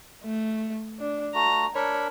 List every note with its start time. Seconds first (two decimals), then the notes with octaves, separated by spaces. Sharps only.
0.24 A3
0.99 D4
1.35 A3 F#4 A#5
1.75 D4 A#4 C#5 B5